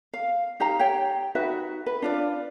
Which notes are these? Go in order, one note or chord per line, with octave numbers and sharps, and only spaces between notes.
F5
D#4 G4 F5 A#5
G4 C#5 G5
D#4 F#4 B4 E5
B4
D4 F4 D5